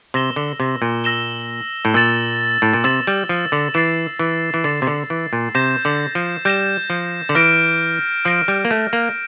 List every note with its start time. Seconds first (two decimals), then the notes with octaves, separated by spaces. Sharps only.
0.14 C3 E6 A#6 E7 G7
0.36 D3
0.60 C3
0.82 A#2
1.04 E6 A#6 E7 G7
1.85 A2
1.94 A#2 E6 A6 E7
2.62 A2
2.73 A#2
2.84 C3 E6 A6 E7
3.07 G3
3.29 F3
3.52 D3
3.74 E3 A6 C7 E7
4.19 E3
4.54 E3
4.64 D3 A6 C7 E7
4.82 C3
4.87 D3
5.10 E3
5.33 A#2
5.55 C3 G6 A#6 E7
5.85 D3
6.15 F3
6.45 G3 G6 A#6 E7
6.90 F3
7.29 D3
7.35 E3 F6 A#6 D7
8.25 F3 F6 A#6 D7
8.48 G3
8.65 A#3
8.71 A3
8.93 A#3